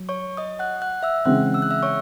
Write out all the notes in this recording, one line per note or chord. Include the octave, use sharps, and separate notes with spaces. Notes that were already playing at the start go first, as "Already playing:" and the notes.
Already playing: F#3
C#5 C#6
D#5 D#6
F#5 F#6
F#5 F#6
E5 E6
C#3 E3 G#3 C4 F#5 F#6
E6
F#6
E5 E6
C#5 C#6